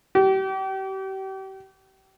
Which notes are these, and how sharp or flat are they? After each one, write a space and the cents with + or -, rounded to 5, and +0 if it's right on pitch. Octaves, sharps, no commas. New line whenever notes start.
G4 -35